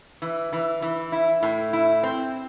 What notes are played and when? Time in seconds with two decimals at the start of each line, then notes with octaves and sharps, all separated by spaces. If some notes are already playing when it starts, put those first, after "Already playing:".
0.22 E3
0.53 E3
0.82 E3
1.12 E4
1.43 A2
1.73 E4
2.03 C4